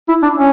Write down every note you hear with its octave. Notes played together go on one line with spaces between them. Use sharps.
E4
D4
C#4